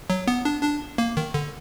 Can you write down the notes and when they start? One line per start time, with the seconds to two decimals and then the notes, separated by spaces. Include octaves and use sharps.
0.10 F#3
0.28 B3
0.45 D4
0.63 D4
0.98 A#3
1.17 D#3
1.34 D3